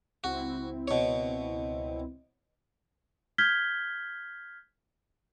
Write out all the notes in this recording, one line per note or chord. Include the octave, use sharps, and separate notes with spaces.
C#2 C4 E4 F#4
B2 C#5
F6 G6 G#6 B6 G7